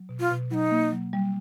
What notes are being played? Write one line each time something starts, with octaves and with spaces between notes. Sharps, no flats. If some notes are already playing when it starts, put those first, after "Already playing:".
Already playing: F#3
B2
F4
B2
F#3 D#4 E4
A#3
F#3
G3